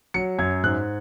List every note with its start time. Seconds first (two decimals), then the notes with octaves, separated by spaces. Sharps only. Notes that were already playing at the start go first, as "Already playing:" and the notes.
0.14 F#3 C#7
0.38 F#2 G#6
0.63 G#2 F#6